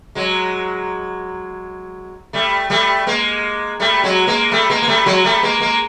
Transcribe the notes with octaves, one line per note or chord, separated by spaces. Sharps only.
F#3 G#3
G3 A3
G3 A3
G#3 A#3
G3 A3
F#3 G#3
G#3 A#3
G3 A3
G#3 A#3
A#3
G3 A3
F#3 G#3
G3 A3
G#3 A#3
G#3 A#3